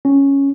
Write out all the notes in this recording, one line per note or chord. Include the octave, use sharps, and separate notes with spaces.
C#4